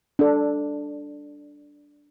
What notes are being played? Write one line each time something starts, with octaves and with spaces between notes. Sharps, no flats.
D4 A4